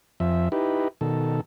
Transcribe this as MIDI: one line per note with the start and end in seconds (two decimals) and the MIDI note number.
0.20 0.49 41
0.20 0.49 53
0.20 0.49 76
0.52 0.88 63
0.52 0.88 64
0.52 0.88 67
0.52 0.88 71
1.01 1.41 47
1.01 1.41 51
1.01 1.41 69